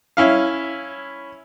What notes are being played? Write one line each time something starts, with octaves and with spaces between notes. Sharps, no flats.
C#4 E4 F5